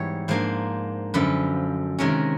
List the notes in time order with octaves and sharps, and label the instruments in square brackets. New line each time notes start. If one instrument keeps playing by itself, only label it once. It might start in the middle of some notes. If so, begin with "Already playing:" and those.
Already playing: [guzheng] G#2 E3 G3 B3 C#5
G#2 F3 A#3 D4 C5
F#2 D3 F3 B4
C3 D#3 G#3 C#4 A#4